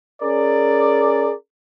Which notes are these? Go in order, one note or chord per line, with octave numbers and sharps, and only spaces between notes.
C#4 G#4 A#4 D5